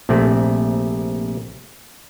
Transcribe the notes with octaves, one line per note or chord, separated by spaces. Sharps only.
A#1 C3 A3 D5